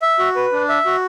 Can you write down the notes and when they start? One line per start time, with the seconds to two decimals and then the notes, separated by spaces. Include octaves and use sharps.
0.02 E5
0.19 F#4
0.36 B4
0.52 D4
0.69 E5
0.86 F#4